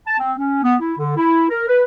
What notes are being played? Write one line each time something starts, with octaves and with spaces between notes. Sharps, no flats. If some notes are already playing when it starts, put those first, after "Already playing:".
A5
C4
C#4
B3
E4
D3
E4
A#4
B4